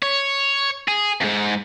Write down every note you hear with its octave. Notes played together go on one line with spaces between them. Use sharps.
C#5
G#4
F2 G#2